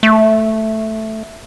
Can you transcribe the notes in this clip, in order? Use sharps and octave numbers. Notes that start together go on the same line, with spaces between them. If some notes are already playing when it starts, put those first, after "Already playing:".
A3